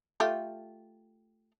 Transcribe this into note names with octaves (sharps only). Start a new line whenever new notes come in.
A3 F4 G4